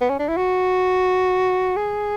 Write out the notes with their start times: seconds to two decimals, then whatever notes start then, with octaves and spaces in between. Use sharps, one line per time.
0.01 B3
0.10 C#4
0.19 D4
0.28 E4
0.37 F#4
1.76 G#4